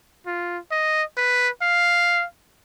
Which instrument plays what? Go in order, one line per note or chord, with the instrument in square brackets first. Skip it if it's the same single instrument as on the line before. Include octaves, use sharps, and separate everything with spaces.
[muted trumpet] F4
D#5
B4
F5